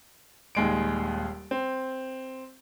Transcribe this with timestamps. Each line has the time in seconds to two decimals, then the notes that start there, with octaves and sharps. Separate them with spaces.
0.55 D#1 D#2 G#3 D7
1.51 C4